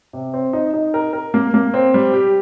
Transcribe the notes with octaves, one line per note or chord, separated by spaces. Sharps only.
C3
C4
D#4
D#4
A#4
A#4
A#3
A#3
C4
G3
G4